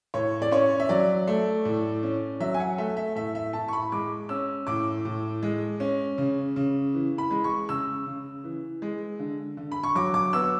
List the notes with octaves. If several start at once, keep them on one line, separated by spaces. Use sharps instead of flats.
A2 C#5
D5
C#4 C#5
E5
F#3 D5
A3
A2
C#4
F#3 E5
G#5
F#5
A3 E5
E5
A2 E5
E5
A2 A5
C#6
B5
G#3 D6
C#4 E6
A2 D6
A2
G#3
C#4
C#3
C#3
E3
B5
G#3
C#6
C#3 E6
C#3
E3
G#3
D3
D3
B5
C#6
F#3 D6
D6
B3 E6